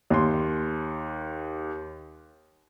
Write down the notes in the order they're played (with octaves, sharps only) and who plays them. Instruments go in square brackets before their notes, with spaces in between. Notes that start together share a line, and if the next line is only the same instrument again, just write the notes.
[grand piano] D#2 C6